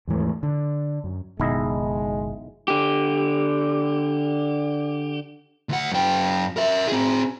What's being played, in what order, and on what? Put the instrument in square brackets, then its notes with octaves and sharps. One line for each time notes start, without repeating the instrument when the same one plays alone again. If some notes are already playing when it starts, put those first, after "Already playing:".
[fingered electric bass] D#2 G#2 E3 A3
D3
F#2
[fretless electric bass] F#1 B2 D#3 [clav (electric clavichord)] B1 E4 D#5 [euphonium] G#3
[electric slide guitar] D3 G4
[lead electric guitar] D2 F#5
F#2 G5
A#4 E5
C4 G#4